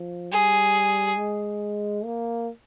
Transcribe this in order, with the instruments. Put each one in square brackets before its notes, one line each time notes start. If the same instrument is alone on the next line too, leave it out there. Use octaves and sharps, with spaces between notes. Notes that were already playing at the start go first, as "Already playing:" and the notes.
Already playing: [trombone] F3
[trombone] G3 [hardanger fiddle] G#4
[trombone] G#3
A#3